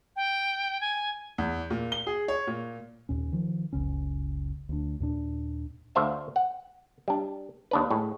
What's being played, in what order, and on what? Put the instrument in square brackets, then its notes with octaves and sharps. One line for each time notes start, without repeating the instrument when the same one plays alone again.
[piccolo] G5
G#5
[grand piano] E2
A#2
G7
G#4
C#5
A#2
[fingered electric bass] D#2 A#2 C#4
D#3 F3
F#1 C#2 C#3 C#4
D2 D4
D#2 A#2 D4
[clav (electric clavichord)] D2 A3 C5 E5 F5 A5
F#5
G3 D4
D#2 D4 B4
A2 G#3